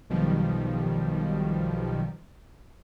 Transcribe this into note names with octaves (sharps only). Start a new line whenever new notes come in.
B1 B2 D#3 F3 G3